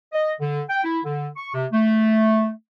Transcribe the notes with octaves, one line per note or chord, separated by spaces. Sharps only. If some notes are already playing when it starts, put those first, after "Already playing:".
D#5
D3
G5
E4
D3
C#6
C3
A3